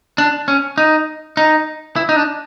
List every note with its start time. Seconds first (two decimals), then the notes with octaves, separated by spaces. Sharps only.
0.18 D4
0.48 C#4
0.78 D#4
1.37 D#4
1.96 E4
2.09 D#4
2.16 D4